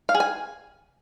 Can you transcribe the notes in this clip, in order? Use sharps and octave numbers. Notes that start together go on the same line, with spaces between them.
F5
G#4
G#5